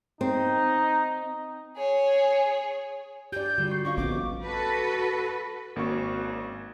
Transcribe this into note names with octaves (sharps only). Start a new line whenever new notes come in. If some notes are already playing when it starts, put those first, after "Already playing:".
C4 D#4
G#4 C#5
G4 D5 G6
D3 G3 F4 F#4
C#6 C7
C#4 F#4 D#5 F5 C#6
A#1 B3 C4 D6
F#4 A4 B4
G#1 A#3 C4 C#4 F#4 C#6